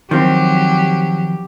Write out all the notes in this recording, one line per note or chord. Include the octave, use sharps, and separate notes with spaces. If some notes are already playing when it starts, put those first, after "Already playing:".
D#3 F3 F#3 C4 G4